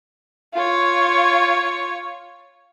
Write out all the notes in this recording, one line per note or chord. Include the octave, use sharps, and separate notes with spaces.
F4 C#5